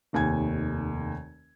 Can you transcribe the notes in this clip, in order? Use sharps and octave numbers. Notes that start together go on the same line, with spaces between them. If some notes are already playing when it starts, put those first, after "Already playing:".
F1 D#2 G#5 G#6